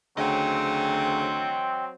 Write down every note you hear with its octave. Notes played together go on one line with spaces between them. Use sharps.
D2 C#3 F#3 C4 D#5 G5